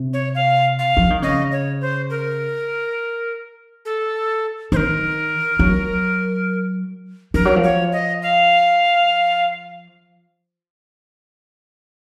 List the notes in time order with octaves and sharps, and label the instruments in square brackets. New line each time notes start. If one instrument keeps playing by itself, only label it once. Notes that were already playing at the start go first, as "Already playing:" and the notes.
Already playing: [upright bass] C3
[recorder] C#5
F5
F5
[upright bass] F3
D#3
[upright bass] C#3 [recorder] D#5
[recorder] C#5
C5
A#4
A4
[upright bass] D#3 [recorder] C5
[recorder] A#4
[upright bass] F#3
[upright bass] F3 [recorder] A#4
[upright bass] F#3
F3
[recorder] C#5
D#5
F5